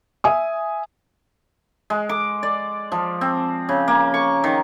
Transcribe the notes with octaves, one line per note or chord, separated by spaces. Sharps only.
E5 G#5 D#6
G#3
D6
D5
F3
C4
C#3
A#3
C#6
D#3